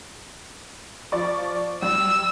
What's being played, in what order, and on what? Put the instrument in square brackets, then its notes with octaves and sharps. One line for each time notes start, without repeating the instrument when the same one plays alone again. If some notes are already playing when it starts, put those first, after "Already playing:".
[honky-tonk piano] F3 D5 C#6
[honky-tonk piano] G3 [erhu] E6